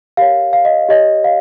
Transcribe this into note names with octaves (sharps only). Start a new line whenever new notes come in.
G4 A#4 C#5 F5
F5
D#5
G4 C#5 D#5
F5